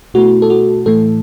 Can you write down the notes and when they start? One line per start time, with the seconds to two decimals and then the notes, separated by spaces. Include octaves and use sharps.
0.14 B2 A3 E4 F#4
0.42 A4
0.50 F#4
0.86 A2 E3 A3 A4